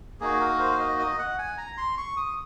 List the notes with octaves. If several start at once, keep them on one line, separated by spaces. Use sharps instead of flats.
A#3 D#4 F#4 G#4
A#4
C5
F5
D#5
D#5
F#5
G#5
A#5
C6
C#6
D#6